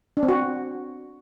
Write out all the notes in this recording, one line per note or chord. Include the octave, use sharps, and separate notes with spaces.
D4
C4
F#4